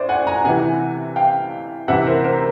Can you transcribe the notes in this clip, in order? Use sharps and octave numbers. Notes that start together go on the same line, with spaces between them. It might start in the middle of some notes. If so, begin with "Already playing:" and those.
Already playing: A2 C5 D5
F#5 G#5
G#5 A#5
C3 E3 F#5 G#5
F5 G5
C3 E3 E5 F#5
A#4 C5
A#4 C5